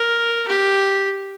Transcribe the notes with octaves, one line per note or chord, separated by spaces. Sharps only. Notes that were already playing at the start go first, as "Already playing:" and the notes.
Already playing: A#4
G4